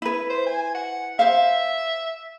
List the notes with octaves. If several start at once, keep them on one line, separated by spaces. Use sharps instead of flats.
E4 B4
C5
G#5
F#5
C5 E5 F5